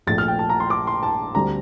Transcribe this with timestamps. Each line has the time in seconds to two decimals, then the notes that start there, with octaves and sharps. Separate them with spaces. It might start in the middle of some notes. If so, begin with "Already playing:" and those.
0.07 A#1 A#2 A3 A6
0.18 F6
0.28 G5
0.39 A5
0.50 A#5
0.60 C6
0.70 D6
0.87 C6
1.03 A5
1.35 D2 D3 G3 C4 A#5